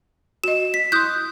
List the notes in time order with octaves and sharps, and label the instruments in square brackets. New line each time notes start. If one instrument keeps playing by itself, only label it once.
[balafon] F#4 D#5 [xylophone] E7
[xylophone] B6
[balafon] E4 C6 [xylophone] D#6 F#6 G6